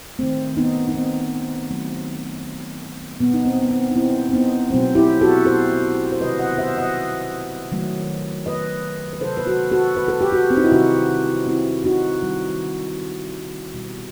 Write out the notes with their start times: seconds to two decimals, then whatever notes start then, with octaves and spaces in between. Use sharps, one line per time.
0.19 D#3 A3 C4
0.57 B3 D#4
0.88 D#4
0.94 C4
1.70 D#3 F#3 A3
3.20 B2 G3 B3
3.34 D#4
3.45 C4
3.62 B3
3.71 C4
3.91 D#4
3.95 C4 E4
4.29 C4
4.33 B3 D#4
4.71 B2 F#3 A3 C4
4.95 E4 G4
5.21 F#4 A4
5.45 A4 C5
6.12 C5
6.20 C3 D#3 G3 B4 D#5
6.39 D#5 F#5
6.58 C5 E5
6.77 D#5 F#5
7.72 D#3 F#3 A3
8.46 B4 D#5
9.13 B4
9.21 C3 F#3 A3 A4 C5
9.37 B4
9.46 F#4 A4
9.72 F#4 A4
9.96 B4
10.08 A4
10.21 G4
10.32 F#4 A4
10.50 C4
10.57 D#4
10.64 E4
10.72 C3 D#3 G3 D#4 F#4
11.47 C4 E4
11.85 D#4 F#4
12.22 D#3 G3
13.74 B2 G3